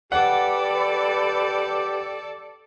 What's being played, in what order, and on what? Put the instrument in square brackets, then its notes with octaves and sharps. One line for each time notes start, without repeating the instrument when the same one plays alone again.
[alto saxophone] G4 [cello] A4 D5 [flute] B4 [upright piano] F#5